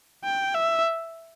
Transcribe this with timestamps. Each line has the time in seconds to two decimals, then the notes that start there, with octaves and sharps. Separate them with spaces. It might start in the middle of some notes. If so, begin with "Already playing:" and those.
0.24 G5
0.55 E5